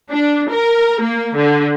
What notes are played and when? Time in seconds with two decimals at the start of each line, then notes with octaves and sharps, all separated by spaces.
0.11 D4
0.50 A#4
1.01 A#3
1.36 D3